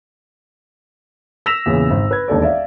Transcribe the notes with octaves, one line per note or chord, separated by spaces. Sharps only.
E6 A#6 B6 E7 F7
E2 A#2 C#3
G#1
B4 G#6
E1 D#2 A4 D5
D5 E5 F5